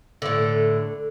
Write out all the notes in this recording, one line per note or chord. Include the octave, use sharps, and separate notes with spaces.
A2 D3